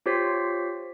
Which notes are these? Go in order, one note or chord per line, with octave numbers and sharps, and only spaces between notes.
F4 G4 C5 C#5 B6 C7